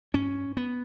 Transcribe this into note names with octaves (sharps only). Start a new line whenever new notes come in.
G2 C#4
B3